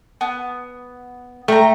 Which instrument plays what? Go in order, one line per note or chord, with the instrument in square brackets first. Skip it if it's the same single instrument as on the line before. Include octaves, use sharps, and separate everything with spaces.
[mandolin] B3
[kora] A3 [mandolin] G5 A#5